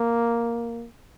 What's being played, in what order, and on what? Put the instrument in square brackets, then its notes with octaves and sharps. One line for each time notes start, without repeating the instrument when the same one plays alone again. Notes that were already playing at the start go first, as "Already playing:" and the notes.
Already playing: [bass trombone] A#3